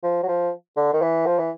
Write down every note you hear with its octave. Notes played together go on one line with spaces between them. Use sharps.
F3
F#3
F3
D3
D#3
E3
F3
E3